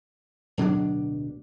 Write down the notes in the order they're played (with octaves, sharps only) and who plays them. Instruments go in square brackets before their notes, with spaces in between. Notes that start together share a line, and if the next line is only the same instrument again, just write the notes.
[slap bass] D1 B2 F#3 D4